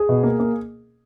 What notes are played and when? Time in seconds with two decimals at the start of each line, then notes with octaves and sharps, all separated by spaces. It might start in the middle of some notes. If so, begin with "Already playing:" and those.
Already playing: G#4
0.09 B2
0.23 A#3
0.40 A#3